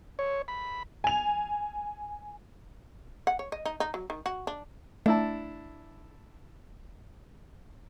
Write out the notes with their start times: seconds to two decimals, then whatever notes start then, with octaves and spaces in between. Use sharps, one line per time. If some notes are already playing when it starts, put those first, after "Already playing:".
0.19 C#5
0.48 B5
1.04 G#5 F7
3.27 F#5
3.39 C#5
3.52 D#5
3.65 D#4
3.80 D#4
3.94 F#3
4.10 D#3
4.26 F#4
4.47 D4
5.06 A3 D4 E4 A5